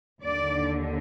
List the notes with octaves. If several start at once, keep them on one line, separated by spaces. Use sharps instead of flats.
D#2 D3 D5